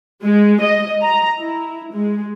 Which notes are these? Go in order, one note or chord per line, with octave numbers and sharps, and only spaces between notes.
G#3
D#5
A#5
E4
G#3